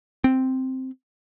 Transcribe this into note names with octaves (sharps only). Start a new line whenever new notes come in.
C4